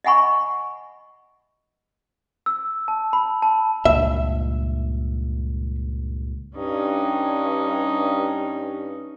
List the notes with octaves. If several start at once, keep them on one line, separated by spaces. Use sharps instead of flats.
D#5 E5 F#5 G#5 B5 C#6
E6
A5
B5
A5
C#2 G2 A#2 E5
G2 C#4 D#4